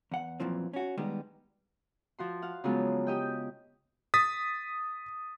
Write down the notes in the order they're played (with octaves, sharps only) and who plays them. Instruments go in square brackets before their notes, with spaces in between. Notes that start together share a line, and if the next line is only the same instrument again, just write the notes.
[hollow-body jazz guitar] E2 F#5
F#2 A#2 E3 F3 C4
C#4 F#4
D#3 G3 G#3 B3
[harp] F3 F#4 C6
F5 F#5
C#3 F3 F#3 G#3 B3 F4
G4 D#5 G5
[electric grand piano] D#6 A6 B6